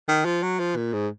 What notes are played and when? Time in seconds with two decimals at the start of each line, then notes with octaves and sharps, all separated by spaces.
0.08 D#3
0.25 F3
0.43 F#3
0.59 F3
0.76 A#2
0.93 G#2